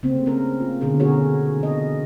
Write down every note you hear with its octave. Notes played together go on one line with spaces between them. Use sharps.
C#3 A3 A#3 C4
C#4 A#4
F4
B2 D3 D4 G#4 A#4
F#4 G#4 A#4 C#5
E3 D#5